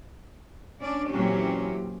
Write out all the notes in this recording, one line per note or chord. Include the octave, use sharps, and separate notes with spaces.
C#4 D4 D5
A#2 E3 F#3 C4 C#4 G4